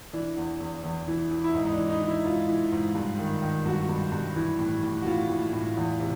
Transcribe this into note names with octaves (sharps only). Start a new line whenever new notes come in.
E3 D4
E2
E2
E2
E3
E3
E4
G#2 D#4
D#4
D4
E3
D#4
E3
E4
G#2 F4
E3
G#2
G2
D#3
D#3
G2 F#4
G2
G2
E3
A2
A2
F#4
A2 F4
A2
A2
E2
C3